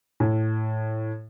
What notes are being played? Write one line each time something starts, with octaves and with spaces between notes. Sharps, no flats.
A2